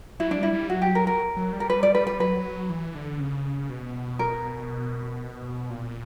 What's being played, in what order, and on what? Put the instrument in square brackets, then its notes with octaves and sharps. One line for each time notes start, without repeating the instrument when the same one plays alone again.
[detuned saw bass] F#3 [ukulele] E4
[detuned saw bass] G3 [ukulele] D4
[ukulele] E4
[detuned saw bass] G3
[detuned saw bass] F#3 [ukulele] F#4
[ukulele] G4
A#4
A#4
[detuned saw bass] F#3
G3
[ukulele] A#4
B4
D5
B4
B4
[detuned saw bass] F#3 [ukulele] B4
[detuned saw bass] E3
D3
C#3
B2
[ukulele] A#4
[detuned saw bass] A#2